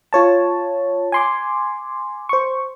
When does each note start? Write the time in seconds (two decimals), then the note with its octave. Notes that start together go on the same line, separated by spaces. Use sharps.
0.13 F4 C#5 A5
1.12 G#5 C6 D6
2.29 C5 C#6